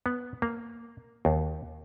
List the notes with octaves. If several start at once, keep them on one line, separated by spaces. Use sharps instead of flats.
B3
A#3
D#2